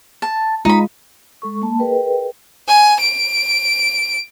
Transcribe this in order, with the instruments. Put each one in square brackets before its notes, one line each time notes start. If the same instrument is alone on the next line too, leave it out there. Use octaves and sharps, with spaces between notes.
[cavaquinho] A5
[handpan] G#3 F4 [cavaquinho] D#4 B5
[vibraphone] G#3 A4 C#6
A#3 A5 B5
G#4 A#4 B4 D#5 G5
[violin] G#5
D7